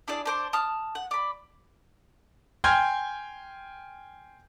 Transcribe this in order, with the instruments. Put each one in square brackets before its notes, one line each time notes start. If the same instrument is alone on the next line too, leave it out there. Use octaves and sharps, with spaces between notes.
[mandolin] D4 E4 G#4 D5
D4 C5 D6
A5 D#6 F6
F#5
D5 B5
[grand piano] G5 G#5 C6 F6 G6 G#6